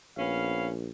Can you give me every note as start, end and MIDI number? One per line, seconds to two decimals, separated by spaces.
0.17 0.90 34
0.17 0.69 59
0.17 0.69 61
0.17 0.69 77